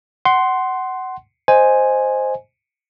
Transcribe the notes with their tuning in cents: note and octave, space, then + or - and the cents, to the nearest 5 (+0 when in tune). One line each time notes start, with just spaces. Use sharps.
F#5 +20 C6 +0
C5 +0 D#5 +0 G#5 +0